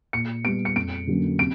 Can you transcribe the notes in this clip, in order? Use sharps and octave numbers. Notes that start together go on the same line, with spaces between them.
A#2 C#7
G3 B3 D7
C#7
F2 D7
D3 F#3 A#3 C#4
C3 D7